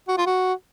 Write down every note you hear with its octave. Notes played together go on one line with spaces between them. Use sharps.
F#4
F4
F#4